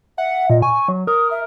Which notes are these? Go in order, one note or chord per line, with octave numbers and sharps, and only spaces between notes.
E5 F#5
A#2 D#5
G#5 C#6
F#3
A#4 D#6
E5